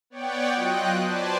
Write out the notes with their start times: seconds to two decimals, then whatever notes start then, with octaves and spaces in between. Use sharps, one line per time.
0.10 B3 C#5 D5 F#5 G5
0.49 F#3 F4 D#5 G5 F#6
1.00 B4 C5 D5 G#5 A5